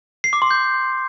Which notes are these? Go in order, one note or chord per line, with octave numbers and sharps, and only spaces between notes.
C7
D6
C6
G6